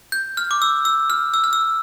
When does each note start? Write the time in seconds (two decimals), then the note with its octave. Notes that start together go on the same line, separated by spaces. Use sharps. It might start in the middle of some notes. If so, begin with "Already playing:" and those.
0.12 G6
0.37 F6
0.51 D6
0.62 E6
0.85 E6
1.10 F6
1.34 E6
1.44 F6
1.53 E6